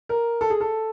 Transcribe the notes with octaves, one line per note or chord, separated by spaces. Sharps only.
A#4
A4
G#4
A4